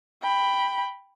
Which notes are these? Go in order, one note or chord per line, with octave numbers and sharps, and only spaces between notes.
G5 B5